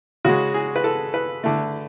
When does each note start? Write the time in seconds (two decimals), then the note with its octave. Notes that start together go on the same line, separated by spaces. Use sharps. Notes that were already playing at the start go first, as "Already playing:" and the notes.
0.25 C#3 G#3 F#4
0.54 G#4
0.76 B4
0.84 A4
1.14 B4
1.44 D3 A3